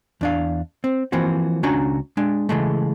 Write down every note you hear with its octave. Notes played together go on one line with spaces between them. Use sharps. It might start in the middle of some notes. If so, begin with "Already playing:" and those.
E2 D4 F5
C4
E3 F3 A#3 C4 F#4
C#2 C#4 D4 F#4 A#5
G#3 D4
C#3 E3 G#3 A3